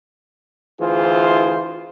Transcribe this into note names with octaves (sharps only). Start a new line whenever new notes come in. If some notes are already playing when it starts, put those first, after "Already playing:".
D2 E3 F4 G#4 C5